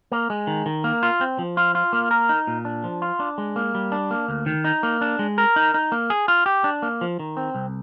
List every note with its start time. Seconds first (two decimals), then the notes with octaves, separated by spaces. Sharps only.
0.12 A#3
0.30 G#3
0.47 D#3
0.66 D#3
0.84 A#3
1.03 F4
1.21 C4
1.39 F3
1.57 F4
1.75 F4
1.93 A#3
2.11 A#4
2.29 D#4
2.47 A#2
2.65 D4
2.84 F3
3.02 F4
3.20 D4
3.38 G#3
3.56 A#3
3.75 G3
3.92 D4
4.11 A#3
4.28 D2
4.46 D#3
4.64 D#4
4.83 A#3
5.01 D4
5.19 G#3
5.38 A#4
5.56 D#4
5.74 D#4
5.92 A#3
6.10 G#4
6.28 F4
6.46 G4
6.64 D4
6.82 A#3
7.01 F3
7.19 D#3
7.37 C4
7.55 C2